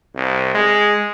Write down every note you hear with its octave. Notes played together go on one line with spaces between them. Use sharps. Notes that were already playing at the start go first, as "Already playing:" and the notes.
C2
G#3